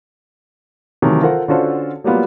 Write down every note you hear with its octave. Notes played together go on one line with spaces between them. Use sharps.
C3 D#3 E3 F#3 A3
F4 A4 A#4 C5 F#5
D3 C#4 F4 F#4 A4 C5
F#3 G3 A#3 B3 F4